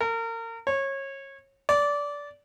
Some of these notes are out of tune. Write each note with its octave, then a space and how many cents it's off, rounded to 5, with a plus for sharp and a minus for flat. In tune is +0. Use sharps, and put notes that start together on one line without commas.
A#4 -35
C#5 -25
D5 -20